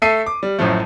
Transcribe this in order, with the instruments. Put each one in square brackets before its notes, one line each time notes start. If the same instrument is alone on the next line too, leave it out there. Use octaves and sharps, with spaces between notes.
[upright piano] A3 A4 E5 C7 D#7
D6
G3
A1 F#2 A2 F3 A3